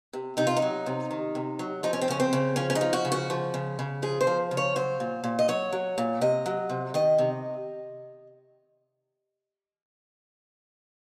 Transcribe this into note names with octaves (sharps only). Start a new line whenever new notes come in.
C3
C3 D#4
F4
D#4
F#3
C3
D#3
C3
F#3
F3 D#4
C#4
C4
C#3 C#4
C4
C#3
F3 C#4
C#4
D#4
F3
F#4
C#3
F#4
F3
C#3
C#3
F3 G#4
C5
F3
C#3
C#5
F#3 C5
A#2
A#2
D#5
F#3 C#5
F#3
A#2
C3 D#5
F#3
C3
D#3 D#5
C3